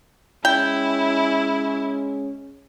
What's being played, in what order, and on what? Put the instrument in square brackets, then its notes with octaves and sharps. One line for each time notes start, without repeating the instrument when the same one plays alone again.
[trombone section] G#3 C#4 [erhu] E4 [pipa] G5